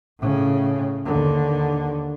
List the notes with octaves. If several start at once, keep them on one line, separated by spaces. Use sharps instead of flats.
A2 C#3
D#2 D3